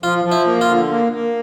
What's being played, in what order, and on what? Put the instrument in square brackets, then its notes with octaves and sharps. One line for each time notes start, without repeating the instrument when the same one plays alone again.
[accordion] F3 [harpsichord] F4
[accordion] F3
[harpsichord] E4
[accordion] A#3
[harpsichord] F4
[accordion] D3
A#3
A#3